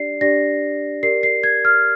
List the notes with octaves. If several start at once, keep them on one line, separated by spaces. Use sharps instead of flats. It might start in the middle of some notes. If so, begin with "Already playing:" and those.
Already playing: D4 G4 D5 C7
D4 G4 D5 A#6
G4 A#4 D5 C7
C7
G#6
F6